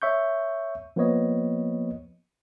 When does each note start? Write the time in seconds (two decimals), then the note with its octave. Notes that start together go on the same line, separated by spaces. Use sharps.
0.02 C#5 E5 C#6 G6
0.96 F3 A#3 B3 B4 C#5 D#5